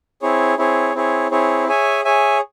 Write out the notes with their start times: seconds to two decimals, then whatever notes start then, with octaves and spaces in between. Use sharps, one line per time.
0.22 C4 E4 G#4 C#5
0.58 C4 E4 G#4 C#5
0.95 C4 E4 G#4 C#5
1.31 C4 E4 G#4 C#5
1.68 G#4 C#5 E5 G#5
2.05 G#4 C#5 E5 G#5